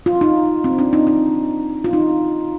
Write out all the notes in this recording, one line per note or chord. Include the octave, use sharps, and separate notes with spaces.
F4
D#4
C4
D4
D#4
D#4
F4
D#4